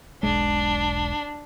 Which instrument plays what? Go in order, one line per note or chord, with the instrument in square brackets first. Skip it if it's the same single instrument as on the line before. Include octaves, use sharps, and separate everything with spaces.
[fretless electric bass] E1 B1 G#3 [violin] D4